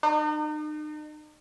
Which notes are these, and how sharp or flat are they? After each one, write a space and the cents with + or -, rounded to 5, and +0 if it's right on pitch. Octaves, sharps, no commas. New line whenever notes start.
D#4 -40